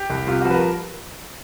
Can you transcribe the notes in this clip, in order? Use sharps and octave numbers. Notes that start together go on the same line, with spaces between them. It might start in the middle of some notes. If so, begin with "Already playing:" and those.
Already playing: G4
C2
C3 F4
F3 F#4
B4
A#4